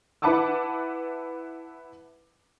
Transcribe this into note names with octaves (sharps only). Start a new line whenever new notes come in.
E4 B4 F#5 A5 D6 E6